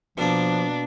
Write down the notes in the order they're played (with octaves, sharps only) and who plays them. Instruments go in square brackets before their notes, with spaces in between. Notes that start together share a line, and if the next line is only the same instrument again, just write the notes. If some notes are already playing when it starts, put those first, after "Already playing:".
[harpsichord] B2 A#3 [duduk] F3 [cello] D4